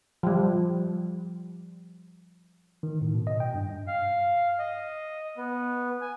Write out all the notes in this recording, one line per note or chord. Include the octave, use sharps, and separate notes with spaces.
F3 G3
D#3
A2
B2
D#5
G5
G2
F5
D#5
B3
G#5